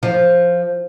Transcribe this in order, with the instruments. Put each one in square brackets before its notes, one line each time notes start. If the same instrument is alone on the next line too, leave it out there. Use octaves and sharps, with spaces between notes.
[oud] F3